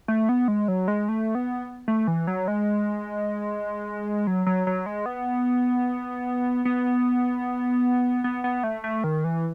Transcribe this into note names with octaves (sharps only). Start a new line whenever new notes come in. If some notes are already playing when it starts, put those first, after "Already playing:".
A3
B3
G#3
F#3
G#3
A3
B3
A3
E3
F#3
G#3
F#3
F#3
F#3
G#3
B3
B3
B3
B3
A3
A3
D#3
E3